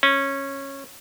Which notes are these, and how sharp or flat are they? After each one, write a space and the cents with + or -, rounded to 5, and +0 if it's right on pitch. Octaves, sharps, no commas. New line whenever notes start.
C#4 -15